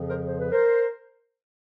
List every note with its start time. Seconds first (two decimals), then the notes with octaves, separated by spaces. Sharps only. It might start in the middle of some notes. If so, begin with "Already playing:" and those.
Already playing: F2 C#3 F3
0.09 A#4 C5
0.26 C5
0.39 B4
0.51 A#4 C5